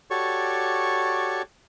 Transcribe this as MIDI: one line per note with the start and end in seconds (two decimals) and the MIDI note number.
0.10 1.42 66
0.10 1.42 67
0.10 1.42 69
0.10 1.42 73
0.10 1.42 74
0.10 1.42 85